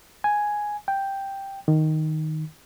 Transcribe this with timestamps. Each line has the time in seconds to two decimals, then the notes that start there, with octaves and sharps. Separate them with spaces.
0.24 G#5
0.88 G5
1.68 D#3